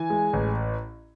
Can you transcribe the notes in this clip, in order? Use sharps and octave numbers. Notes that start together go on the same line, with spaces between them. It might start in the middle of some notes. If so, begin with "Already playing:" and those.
Already playing: E3 G#5
G#3
A1